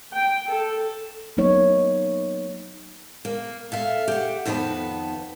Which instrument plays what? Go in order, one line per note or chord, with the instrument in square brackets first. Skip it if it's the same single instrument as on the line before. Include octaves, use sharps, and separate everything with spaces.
[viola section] G5
A4
[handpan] F#3 A#3 B3 D#4 C#5
[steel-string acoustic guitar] A#3
A4 E5 F5
G4 F#5
F2 D#3 B3 B4 A5